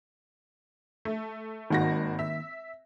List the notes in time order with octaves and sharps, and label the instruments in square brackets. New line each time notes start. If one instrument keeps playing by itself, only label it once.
[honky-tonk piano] A3
[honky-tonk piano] G#1 F#4 A#6 [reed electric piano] D#3 A#3
[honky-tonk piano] E5